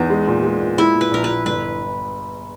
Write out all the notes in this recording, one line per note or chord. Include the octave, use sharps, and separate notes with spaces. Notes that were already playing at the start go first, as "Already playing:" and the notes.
Already playing: E2 D#4
G#3
A#2
G#3
A#2
G#3 E4
A#2
B4
A#1 A#4
A#1 B4
G1 B4